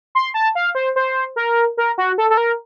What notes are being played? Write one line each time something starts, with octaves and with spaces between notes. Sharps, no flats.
C6
A5
F5
C5
C5
A#4
A#4
F#4
A4
A4
A#4